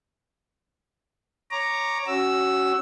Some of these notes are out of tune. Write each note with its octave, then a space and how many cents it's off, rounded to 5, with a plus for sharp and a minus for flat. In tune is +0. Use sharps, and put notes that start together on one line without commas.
C#5 +0 A#5 +0 D6 +15
C#4 +0 F#4 +20 E6 +0